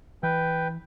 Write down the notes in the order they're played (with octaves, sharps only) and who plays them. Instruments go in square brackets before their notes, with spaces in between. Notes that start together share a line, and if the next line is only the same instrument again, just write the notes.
[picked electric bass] E3 [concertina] B4 G5